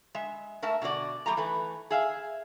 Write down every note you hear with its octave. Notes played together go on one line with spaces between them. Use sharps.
G#3 E5
A3 A#4 E5 A5
B2 D3 F#4 D5
E2 A#2 G3 A3 A#5
E3 A3 B4
G#4 E5 F5